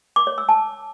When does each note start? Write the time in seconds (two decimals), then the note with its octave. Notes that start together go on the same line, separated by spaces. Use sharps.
0.16 D6
0.27 C#5
0.38 E6
0.49 A5